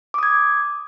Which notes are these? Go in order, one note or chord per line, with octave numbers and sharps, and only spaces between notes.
D6 D#6 G#6